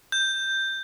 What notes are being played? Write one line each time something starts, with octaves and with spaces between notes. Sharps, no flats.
G6